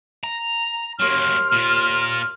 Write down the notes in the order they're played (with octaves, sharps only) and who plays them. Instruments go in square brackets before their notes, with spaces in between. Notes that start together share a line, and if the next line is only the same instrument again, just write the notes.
[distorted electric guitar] A#5
[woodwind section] D#2 C6 F6 [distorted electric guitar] F#3 A#3
[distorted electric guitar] A#2 F4